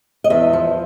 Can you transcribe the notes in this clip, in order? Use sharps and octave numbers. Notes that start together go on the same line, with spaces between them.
D#5
E2 E5
F3